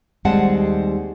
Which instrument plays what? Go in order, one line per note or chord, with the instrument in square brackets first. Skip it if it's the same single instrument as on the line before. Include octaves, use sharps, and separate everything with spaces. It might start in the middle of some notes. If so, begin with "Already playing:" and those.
[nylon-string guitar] D#2 G3 G#3 C4 F#5 A5